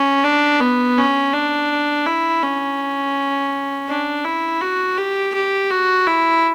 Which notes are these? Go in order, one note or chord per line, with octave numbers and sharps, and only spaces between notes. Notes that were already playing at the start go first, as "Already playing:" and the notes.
Already playing: C#4
D4
B3
C#4
D4
E4
C#4
D4
E4
F#4
G4
G4
F#4
E4